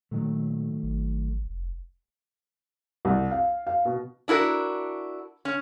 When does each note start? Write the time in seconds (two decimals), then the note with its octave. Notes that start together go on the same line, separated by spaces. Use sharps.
0.11 A#2 D#3 F#3 A3
0.83 G#1
1.45 F1
3.05 C2
3.31 F5
3.67 F5
3.85 B2
4.28 D4 E4 F#4 A#4
5.45 C#4